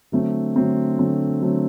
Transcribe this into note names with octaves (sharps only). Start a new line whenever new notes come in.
D3 F#3 A3 C4
D3 F#3 A3 C4
D3 F#3 A3 C4
D3 F#3 A3 C4